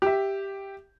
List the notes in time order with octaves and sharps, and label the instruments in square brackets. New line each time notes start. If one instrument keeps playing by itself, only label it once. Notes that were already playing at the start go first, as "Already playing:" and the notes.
[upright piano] G4 E5